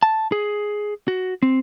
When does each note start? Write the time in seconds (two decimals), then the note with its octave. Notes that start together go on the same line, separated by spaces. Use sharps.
0.03 A5
0.32 G#4
1.08 F#4
1.43 C4